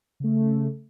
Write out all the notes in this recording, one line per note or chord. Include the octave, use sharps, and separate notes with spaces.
C#3 A3